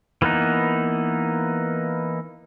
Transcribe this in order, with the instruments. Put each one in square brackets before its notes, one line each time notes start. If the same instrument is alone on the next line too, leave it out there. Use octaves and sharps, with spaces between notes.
[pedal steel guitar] E3 A#3 B3 D#4